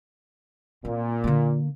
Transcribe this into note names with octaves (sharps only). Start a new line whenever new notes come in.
A#2 C4
D3 A#3